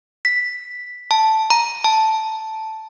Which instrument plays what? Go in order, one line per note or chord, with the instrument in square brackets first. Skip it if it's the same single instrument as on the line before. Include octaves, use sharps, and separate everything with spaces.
[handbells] B6
A5
A#5
A5